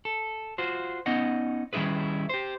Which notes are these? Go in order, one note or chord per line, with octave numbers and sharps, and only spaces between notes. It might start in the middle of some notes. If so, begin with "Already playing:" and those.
A4
F4 F#4 C5
B3 C#4 D#4 D#5 F#5
D#3 G3 C#4 E4 G#4 B4
G4 C5